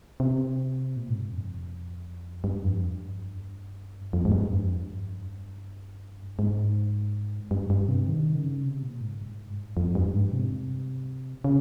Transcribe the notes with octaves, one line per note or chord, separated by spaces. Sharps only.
C3
A#2
G#2
G2
F2
G2
F2
G2
F2
G#2
G2
F2
G2
G#2
G2
G2
C3
D#3
C#3
C3
A#2
G#2
G2
G#2
F2
G2
G#2
C3
C#3